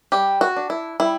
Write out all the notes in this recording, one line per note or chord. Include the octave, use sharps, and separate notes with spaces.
G3 G4
F#4
D4
E4
G3 E4